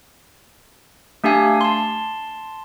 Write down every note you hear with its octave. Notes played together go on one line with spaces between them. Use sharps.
A3 D4 G4 F5 G#5
A5 C6